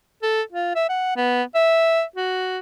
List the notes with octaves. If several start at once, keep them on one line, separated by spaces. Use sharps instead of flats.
A4
F4
E5
F#5
B3
E5
F#4